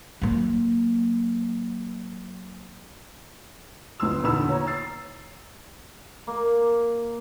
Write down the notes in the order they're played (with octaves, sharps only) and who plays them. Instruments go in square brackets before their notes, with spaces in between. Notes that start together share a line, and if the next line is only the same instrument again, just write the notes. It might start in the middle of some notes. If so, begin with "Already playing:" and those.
[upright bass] F#3 A#3
[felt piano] G1 D2 E4 C6 E6
E2 A#2 D3 D#3 B5 E6
C#5 A#5
E6 A6 C7
[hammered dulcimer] A#3